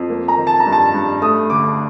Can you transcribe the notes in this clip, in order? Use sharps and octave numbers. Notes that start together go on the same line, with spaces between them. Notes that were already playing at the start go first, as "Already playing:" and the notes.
Already playing: F2
A#3
A#5
D#3
A5
A#5
G2
A5
G2
A3 D#6
D3 D6